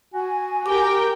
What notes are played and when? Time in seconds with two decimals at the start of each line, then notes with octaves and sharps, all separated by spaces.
0.14 F#4 G#5
0.66 G4 A#4 G5 D6